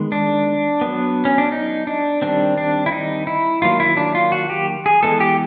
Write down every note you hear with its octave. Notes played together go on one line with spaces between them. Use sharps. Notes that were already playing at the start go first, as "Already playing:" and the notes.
Already playing: D#3 G#3 B3
D4
F#3 B3
C#4
D4
D#4
D4
D#3 G3 C4 D4
D4
E4
D#4
E4
D#3 F#3 A#3 F4
E4
D4
F4
F#4
G4
G#4
E3 G#3 B3 A4
G4